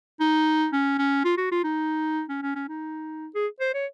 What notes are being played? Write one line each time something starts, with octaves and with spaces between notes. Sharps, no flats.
D#4
C#4
C#4
F4
F#4
F4
D#4
C#4
C#4
C#4
D#4
G#4
C5
C#5